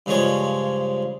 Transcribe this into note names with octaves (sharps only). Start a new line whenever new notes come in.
G2 C#3 F3 G#3 C#5